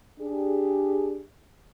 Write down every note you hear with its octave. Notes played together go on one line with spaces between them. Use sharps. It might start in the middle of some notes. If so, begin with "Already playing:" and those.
D4 G4 G#4